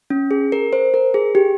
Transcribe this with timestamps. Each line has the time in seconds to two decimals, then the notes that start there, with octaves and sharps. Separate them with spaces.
0.10 C#4
0.31 G#4
0.52 A#4
0.73 C5
0.94 A#4
1.14 G#4
1.35 G4